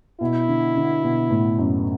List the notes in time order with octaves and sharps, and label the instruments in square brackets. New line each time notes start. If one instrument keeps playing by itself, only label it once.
[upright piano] B2 [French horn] E4
[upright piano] D3
D3
B2
A2
F#2